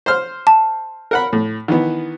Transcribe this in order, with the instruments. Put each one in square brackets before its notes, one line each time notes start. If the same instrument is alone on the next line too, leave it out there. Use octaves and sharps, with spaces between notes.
[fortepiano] C5 C6 F6
[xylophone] A5
[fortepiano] A#4 F#5 B5
A2
D#3 E3 B3